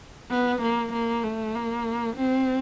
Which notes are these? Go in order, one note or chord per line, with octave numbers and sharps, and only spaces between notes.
B3
A#3
A#3
A3
A#3
C4